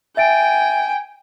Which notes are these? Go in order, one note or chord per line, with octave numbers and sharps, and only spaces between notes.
E5 G5 G#5 A6 D7